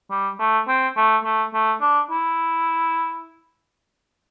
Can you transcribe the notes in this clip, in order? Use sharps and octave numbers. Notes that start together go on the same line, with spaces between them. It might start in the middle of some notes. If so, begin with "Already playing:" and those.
G3
A3
C4
A3
A3
A3
D4
E4